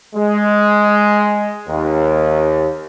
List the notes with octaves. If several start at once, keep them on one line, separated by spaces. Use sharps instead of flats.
G#3
D#2